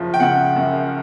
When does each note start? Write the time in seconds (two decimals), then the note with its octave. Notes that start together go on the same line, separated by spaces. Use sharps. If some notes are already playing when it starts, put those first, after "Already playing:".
Already playing: F#1 F3
0.14 G5
0.20 C#3 F#5
0.56 F#2